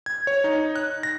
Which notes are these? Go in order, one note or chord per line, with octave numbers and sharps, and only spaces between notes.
G#6
C#5
D#4
F#6
A#6